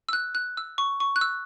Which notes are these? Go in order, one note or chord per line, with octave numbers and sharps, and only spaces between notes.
E6
F#6
F#6
E6
C#6
C#6
F#6
E6